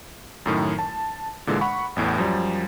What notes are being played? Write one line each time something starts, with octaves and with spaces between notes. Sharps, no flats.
F#2 A2 D#3
A5
A#2 D3 E3 G#3
F#5 B5 C#6
A1 E2 A2
F#2 F3 G3